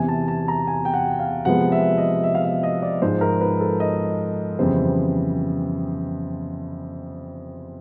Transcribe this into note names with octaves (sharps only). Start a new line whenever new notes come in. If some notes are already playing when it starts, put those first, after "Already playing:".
Already playing: E2 C3 E3 G#5
A5
A5
A#5
G#5
G5
F#5
F5
C3 F3 G#3 B3 F#5
E5
D#5
E5
F5
E5
D#5
D5
G#2 F3 G#3 C5
A#4
B4
A4
D#5
F2 C#3 E3 G3 B3 C5